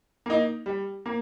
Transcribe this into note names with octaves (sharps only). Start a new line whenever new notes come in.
A#3 D#4
G3
A#3